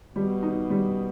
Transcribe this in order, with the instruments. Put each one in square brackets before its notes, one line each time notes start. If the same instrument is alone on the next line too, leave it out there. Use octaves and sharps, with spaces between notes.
[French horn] B2 [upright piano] G3
[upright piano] D#4
G3